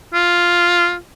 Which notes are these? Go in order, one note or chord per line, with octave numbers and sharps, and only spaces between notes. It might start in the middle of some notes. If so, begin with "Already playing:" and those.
F4